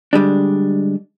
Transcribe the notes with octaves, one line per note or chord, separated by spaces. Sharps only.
D3 G3 G#3 D4